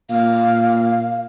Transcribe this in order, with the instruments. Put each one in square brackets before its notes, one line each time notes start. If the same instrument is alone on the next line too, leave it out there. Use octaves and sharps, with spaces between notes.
[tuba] A#2 [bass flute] F5